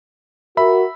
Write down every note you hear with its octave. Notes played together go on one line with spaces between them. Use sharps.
F#4 A#4 E5 B5